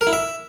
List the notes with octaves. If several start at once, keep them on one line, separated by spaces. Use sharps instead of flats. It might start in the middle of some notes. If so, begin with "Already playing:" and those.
A#4
E4
E5